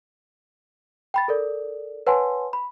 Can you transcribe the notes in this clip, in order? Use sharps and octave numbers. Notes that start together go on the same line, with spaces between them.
G5 B5 A6
A4 A#4 D5
B4 C#5 F#5 G#5 A5 C6
B5